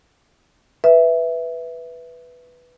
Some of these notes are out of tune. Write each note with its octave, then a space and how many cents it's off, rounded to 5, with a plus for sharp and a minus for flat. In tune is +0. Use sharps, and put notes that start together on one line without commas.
B4 +0 E5 +0